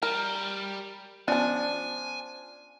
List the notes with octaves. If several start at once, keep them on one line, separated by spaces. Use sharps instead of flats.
G3 A#4
F3 B3 C#4 D4 D5 G#5